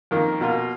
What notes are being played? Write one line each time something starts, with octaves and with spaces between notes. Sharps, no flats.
F2 D#3 A#3
B2 A#3 F4